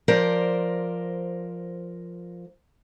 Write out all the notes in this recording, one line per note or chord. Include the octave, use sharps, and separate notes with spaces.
F3 A#4 C5 D5